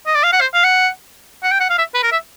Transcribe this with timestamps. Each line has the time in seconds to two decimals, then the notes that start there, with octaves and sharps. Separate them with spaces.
0.07 D#5
0.15 D5
0.23 F5
0.33 F#5
0.41 C5
0.54 F5
0.64 F#5
1.43 F#5
1.51 G5
1.60 F#5
1.70 F5
1.78 E5
1.94 B4
2.03 A#4
2.12 E5